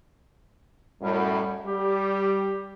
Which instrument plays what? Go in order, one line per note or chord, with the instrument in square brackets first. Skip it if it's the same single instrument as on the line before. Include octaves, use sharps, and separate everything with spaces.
[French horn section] F#2 A2 [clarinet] G3
[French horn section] G3 [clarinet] G4